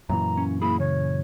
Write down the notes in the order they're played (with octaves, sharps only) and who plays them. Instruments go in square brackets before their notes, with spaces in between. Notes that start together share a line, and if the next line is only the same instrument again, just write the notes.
[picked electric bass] F#2 A#2 E3 [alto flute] A#5
[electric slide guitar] C#4
[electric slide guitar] A#3 E4 G#4 [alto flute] B5
[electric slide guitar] C#3 [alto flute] C#5